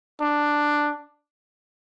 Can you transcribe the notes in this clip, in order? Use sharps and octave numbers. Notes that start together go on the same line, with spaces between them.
D4